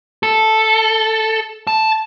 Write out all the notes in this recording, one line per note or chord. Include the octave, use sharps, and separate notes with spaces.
A4
A5